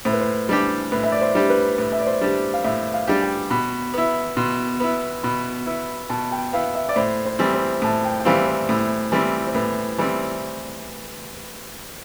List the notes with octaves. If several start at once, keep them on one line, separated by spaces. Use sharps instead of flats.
A2 C5
B4
C5
G3 D4 G4
A2 B4
E5
D5
C5
G3 D4 G4
B4
A2 B4
E5
D5
C5
G3 D4 G4
F5
A2 E5
F5
G3 D4 G4
G5
B2 B5
B3 E4
B2 C6
B3 E4
B2 B5
B3 E4
B2 A5
G5
B3 E4 F5
E5
D5
A2 C5
C5
E3 G3 C4
C5
A2 A5
G5
G5
E3 G3 C4 F5
C5
A2
E3 G3 C4
C5
A2 B4
E3 G3 C4